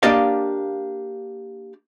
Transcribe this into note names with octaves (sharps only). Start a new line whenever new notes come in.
A#3 D4 G4 D5 D#5 F5